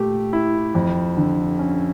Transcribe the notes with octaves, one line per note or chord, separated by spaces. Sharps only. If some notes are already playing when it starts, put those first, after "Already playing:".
Already playing: A#2 A3 G4
E4
F2
D3
C#4